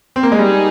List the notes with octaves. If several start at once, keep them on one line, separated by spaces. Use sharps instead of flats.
C4
A#3
G#3
G3 D#4 G#4